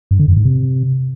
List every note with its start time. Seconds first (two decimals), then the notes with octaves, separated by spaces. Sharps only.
0.11 G2
0.19 D3
0.28 F#2
0.37 G#2
0.45 C3